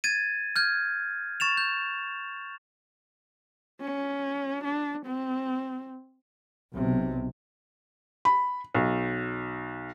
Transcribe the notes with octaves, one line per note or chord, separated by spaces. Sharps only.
G#6 A6 D#7
F6 G6 G#6
C#6 A6 E7 F7
G6
C#4
D4
C4
B1 C3
B5
B1